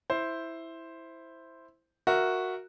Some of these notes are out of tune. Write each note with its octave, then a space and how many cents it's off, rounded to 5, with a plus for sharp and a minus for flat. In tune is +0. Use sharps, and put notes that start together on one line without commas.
E4 +0 C5 +0
F#4 -5 A#4 +0 E5 +0